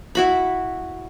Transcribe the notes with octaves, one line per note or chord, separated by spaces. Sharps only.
E4 F#4 B5